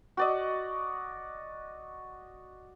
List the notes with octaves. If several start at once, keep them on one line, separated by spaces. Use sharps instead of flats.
F#4 D5 D#5